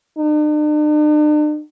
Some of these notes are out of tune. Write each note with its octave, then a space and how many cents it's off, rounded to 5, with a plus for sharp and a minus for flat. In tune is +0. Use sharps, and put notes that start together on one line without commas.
D4 +45